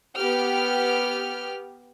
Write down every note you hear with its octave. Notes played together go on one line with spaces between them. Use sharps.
B3 G4 F6